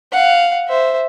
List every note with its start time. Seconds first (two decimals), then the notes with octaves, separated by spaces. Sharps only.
0.12 F5 F#5
0.68 C5 E5